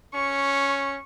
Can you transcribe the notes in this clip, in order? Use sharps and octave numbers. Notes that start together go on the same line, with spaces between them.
C#4 C#6